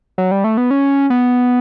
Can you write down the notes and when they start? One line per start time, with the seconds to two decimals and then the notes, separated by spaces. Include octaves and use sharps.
0.18 F#3
0.31 G3
0.44 A3
0.57 B3
0.71 C#4
1.10 B3